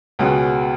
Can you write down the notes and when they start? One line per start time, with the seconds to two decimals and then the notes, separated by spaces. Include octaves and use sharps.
0.19 C#2 B2 G#3 C#4 F#4